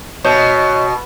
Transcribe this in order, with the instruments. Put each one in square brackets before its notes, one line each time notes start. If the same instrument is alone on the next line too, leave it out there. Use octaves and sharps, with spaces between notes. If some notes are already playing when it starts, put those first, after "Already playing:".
[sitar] B2 [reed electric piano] C#5 D#5 G6